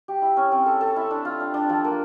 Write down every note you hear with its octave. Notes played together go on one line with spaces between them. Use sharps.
G4
E4
C#4
C4
A4
A4
E4
D4
F4
D4
D4
F3
A#3